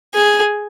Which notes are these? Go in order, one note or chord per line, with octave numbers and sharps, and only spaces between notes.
G#4